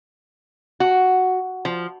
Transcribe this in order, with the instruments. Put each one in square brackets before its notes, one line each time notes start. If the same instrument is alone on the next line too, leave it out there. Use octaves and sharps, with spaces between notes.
[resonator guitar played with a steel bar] F#4
F3